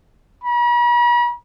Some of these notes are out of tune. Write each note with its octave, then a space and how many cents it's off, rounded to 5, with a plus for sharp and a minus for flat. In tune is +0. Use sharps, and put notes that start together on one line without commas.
B5 -45